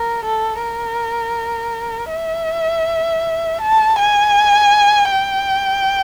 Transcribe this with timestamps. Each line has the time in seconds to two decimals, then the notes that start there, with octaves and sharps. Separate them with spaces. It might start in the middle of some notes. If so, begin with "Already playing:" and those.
Already playing: A#4
0.25 A4
0.62 A#4
2.12 E5
3.61 A5
3.99 G#5
5.12 G5